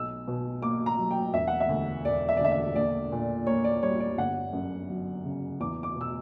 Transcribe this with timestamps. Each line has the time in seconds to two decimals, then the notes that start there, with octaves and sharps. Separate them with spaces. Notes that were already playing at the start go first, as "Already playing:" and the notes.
Already playing: B1 E6
0.28 B2
0.62 A#3 D6
0.86 A#5
0.99 F#3
1.11 G5
1.34 E1 E5
1.48 F#5
1.60 E5
1.69 D2
2.05 E1 D5
2.29 E5
2.37 D5
2.40 D3 E5
2.52 E5
2.76 A#1 D5
3.12 A#2
3.46 A#3 C#5
3.64 D5
3.82 G3 C#5
4.00 D5
4.18 G1 F#5
4.53 F#2
4.90 F#3
5.25 C#3
5.60 E2 D6
5.83 D6
5.95 B2
6.01 E6